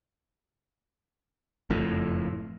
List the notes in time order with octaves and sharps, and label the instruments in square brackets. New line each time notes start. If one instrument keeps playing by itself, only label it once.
[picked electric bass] F#1 F2 A2